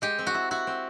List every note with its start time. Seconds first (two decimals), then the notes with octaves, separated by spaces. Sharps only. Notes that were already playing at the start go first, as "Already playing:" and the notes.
0.02 G#3 G4
0.19 C4
0.27 F#4
0.34 E4
0.51 E4 F#4
0.67 C4